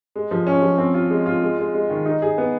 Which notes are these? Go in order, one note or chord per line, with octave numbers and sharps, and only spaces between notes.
G#3
F3
C#4
F3
C4
F4
G#3
F4
G#3
G#3
G#3
D#3
D#4
G#4
B3